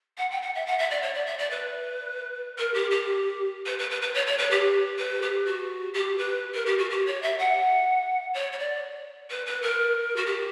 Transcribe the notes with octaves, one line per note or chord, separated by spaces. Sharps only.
F#5
G5
F#5
E5
F#5
E5
D5
C#5
D5
E5
D5
B4
A#4
G4
G4
B4
B4
B4
B4
C#5
C#5
B4
G4
B4
G4
F#4
G4
B4
A#4
G4
F#4
G4
C#5
E5
F#5
C#5
C#5
D5
B4
B4
A#4
F#4
G4